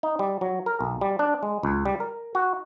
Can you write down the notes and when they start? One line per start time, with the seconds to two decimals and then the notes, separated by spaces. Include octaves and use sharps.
0.03 D#4
0.19 G3
0.41 F#3
0.66 A#4
0.81 B1
1.01 G3
1.19 D4
1.43 G#3
1.63 C#2
1.86 G3
2.00 A#4
2.35 F#4